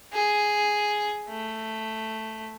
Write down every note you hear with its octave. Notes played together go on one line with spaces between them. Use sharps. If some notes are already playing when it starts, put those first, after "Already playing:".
G#4
A3